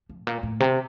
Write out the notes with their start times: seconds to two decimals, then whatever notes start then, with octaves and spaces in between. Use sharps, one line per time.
0.09 F3
0.18 A2
0.27 A#2
0.43 A2
0.60 C3